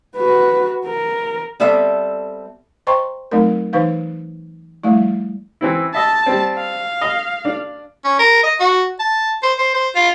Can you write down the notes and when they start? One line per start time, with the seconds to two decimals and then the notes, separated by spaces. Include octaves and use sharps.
0.17 F#4 B4
0.86 A#4
1.60 G3 B3 C4 A4 D5 E5
2.87 C5 D#5 G5 A#5 C6 C#6
3.31 F#3 A3 C4 D#4 A#4
3.73 E3 D#4 B4 C5 F5
4.84 F3 G3 A3 E4
5.61 E3 C4 E4
5.95 D#5 E5 A5
6.26 G3 C4
6.57 F5
7.01 D#5
7.45 D4
8.04 C#4
8.19 A#4
8.43 D#5
8.60 F#4
8.99 A5
9.43 C5
9.59 C5
9.74 C5
9.95 F4